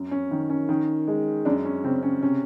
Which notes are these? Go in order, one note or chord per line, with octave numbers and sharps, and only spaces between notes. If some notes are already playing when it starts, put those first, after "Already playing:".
Already playing: F#2
C#4
D#3
C#4
D#3
G#3
F#2 D4
C#4
C#3 C4
C#4
C3 C#4